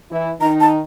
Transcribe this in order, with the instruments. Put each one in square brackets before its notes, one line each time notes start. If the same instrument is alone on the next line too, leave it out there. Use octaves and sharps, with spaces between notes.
[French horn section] E3 E4
[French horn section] D#3 D#4 [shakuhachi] A#5
[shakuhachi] A5